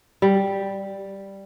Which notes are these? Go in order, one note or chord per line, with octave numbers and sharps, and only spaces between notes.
G3